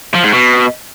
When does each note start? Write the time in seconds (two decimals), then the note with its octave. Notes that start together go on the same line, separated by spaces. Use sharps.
0.14 F3
0.23 G#2
0.33 B2